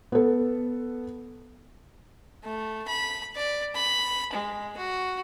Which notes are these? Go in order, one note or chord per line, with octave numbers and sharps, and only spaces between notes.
B3 A4
A3
B5
D5
B5
G#3
F#4